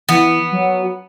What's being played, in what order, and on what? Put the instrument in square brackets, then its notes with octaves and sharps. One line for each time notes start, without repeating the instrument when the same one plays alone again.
[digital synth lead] E3 [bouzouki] B3
[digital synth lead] F#3